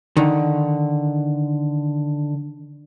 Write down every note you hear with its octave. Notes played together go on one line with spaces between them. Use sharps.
D3 D#3